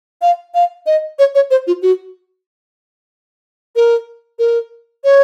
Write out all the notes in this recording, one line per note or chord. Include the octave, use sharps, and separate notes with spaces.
F5
F5
D#5
C#5
C#5
C5
F4
F#4
A#4
A#4
C#5